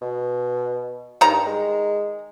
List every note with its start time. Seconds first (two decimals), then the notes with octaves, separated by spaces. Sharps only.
0.01 B2
1.21 G2 D#3 A#5
1.46 G#3